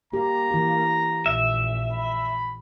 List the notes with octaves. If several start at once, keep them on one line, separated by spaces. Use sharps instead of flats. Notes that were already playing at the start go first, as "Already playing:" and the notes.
A#3 G4 A#5
E3 G4
A#1 E5
B5